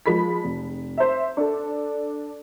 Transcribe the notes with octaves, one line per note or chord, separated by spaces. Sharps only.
F3 G#3 B5 B6
F1
C5 E5
D4 A4